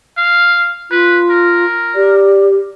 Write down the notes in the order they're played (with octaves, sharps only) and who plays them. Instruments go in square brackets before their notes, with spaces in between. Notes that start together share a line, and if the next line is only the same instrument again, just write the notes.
[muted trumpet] F5
[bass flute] F4 [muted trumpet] B4
[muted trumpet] A#4
[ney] G4 [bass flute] D5